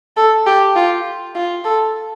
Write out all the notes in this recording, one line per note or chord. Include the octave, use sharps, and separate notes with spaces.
A4
G4
F4
F4
A4